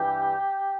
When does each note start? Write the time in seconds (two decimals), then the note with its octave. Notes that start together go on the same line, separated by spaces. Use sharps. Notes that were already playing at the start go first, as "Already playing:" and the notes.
Already playing: G2 E3 G3 G4